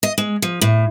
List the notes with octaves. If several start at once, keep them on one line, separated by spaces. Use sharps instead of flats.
D#5
G#3
F3
A2